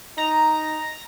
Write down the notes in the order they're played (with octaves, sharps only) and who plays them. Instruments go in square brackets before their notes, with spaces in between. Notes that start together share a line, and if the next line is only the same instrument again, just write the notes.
[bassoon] D#4 [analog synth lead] A#5